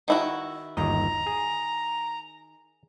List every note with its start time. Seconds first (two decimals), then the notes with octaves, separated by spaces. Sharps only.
0.08 D#3 E4 F#4
0.77 G1 D#2 D#5 A#5
1.27 G#4